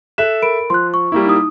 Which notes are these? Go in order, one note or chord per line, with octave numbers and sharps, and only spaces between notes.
A4 E5 F#6 E7
A#4 B5 D7
F3 C6 F#6
C#6
G3 A#3 E4
D#4 D#6